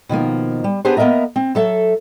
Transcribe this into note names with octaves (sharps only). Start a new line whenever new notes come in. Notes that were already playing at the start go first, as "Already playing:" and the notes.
B2 D#3 F3 A#3
G3
B3 D4 G4 G#4 B4 C5
A#3 B3 A#4 D#5 E5 A#5
C4
F#3 A4 E5